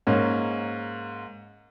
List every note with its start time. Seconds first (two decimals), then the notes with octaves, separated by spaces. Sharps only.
0.07 G#2 A#3 C#4